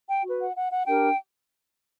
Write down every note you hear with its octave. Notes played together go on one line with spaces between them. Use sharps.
G5
F#4 B4
F#5
F#5
F#5
D4 G4 A#4 G5